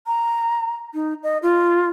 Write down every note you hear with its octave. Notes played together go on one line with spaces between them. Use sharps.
A#5
D#4
D#5
F4